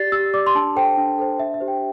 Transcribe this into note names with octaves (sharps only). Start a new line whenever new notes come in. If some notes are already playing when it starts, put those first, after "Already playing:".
Already playing: G4 D5 A6 C7
G4 E6
D5 D6
C6
D4 A5
A4 C5 G5
D4
A4 C5
D4 E5
E5
G4 C5
G5